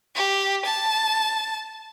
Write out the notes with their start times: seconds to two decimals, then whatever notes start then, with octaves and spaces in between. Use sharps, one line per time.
0.16 G4
0.66 A5